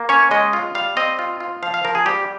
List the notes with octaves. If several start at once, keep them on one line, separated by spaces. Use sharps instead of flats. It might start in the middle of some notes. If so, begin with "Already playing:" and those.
Already playing: A#3
C#4 C#5
G#3 D#5
F4
G3 F5
C4 D#5
F4
F4
F3 F5
F5
F3 A#4
G#4
G3 G4